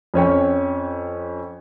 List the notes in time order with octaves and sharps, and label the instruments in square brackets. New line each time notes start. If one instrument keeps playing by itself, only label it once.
[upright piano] F2 C#4 C#5 G5